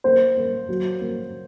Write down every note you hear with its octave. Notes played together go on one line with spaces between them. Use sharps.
A#3 C5
A#3
F#3
A#3